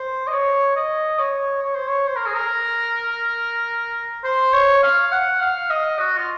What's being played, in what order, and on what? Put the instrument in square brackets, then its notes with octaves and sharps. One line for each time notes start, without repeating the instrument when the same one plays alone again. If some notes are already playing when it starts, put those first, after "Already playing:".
Already playing: [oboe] C5
D#5
C#5
D#5
C#5
C#5
C5
C#5
C5
A#4
G#4
A#4
C5
C#5
F5
F#5
F5
D#5
F#4
F4